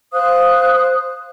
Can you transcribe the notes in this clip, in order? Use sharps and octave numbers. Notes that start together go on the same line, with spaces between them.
C5 F5 D#6 F#6